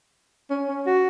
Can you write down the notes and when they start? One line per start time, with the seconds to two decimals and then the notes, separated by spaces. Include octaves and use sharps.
0.50 C#4
0.68 C#4
0.86 F#4